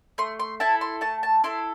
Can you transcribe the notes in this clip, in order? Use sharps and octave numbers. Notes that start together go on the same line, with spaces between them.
A3 C6
C6
E4 A4 A5
C6
A3 A5
A5
E4 A4 C6